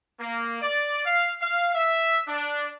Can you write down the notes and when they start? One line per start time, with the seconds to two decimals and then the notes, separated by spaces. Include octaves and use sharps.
0.20 A#3
0.61 D5
1.06 F5
1.41 F5
1.74 E5
2.28 D4